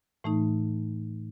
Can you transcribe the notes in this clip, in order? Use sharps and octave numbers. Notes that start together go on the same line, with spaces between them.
A2 E3 A3 D#4